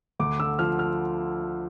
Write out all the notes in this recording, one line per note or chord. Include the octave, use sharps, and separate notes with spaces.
D2 D6
D3 E6
F3 F6
F6